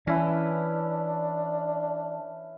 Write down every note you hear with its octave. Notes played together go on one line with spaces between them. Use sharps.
E3 C#4 D4 E4 B4